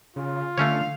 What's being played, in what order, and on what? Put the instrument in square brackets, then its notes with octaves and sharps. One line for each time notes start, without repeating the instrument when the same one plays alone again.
[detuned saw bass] C#3 [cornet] F4
[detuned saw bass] D3 [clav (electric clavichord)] A3 C#4 C#5 [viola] F5